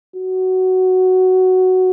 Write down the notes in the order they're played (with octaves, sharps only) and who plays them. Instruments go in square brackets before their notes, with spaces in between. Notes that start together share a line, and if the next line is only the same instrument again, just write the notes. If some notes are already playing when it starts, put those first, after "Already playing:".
[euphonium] F#4